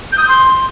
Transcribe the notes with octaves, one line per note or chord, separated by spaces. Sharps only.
G6
D#6
G6
C6